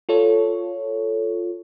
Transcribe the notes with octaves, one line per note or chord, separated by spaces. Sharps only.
F4 A4 C#5